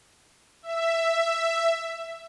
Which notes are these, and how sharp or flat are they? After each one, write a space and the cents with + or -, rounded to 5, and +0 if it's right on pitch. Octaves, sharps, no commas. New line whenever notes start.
E5 +10